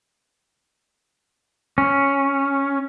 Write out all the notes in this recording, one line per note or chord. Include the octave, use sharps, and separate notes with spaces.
C#4